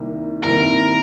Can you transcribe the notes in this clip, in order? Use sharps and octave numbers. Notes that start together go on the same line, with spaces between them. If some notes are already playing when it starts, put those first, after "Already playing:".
Already playing: C2 C3 D#3 A#3
C2 C3 D#3 A#3 A#4